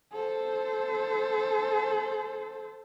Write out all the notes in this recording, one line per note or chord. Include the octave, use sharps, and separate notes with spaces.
A4 C5